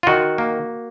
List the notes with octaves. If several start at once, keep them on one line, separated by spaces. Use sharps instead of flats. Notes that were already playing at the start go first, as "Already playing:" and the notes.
F4
D#3 F#4
A#3